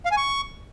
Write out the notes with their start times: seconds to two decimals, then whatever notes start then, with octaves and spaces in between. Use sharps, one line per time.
0.05 F5
0.11 G#5
0.17 C#6